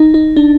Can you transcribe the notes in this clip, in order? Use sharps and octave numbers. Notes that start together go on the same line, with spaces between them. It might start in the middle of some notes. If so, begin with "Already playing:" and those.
Already playing: D#4
D#4
D4